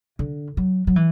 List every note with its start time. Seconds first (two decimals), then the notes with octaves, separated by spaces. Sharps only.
0.19 D3
0.57 F#3
0.87 F#3
0.96 E3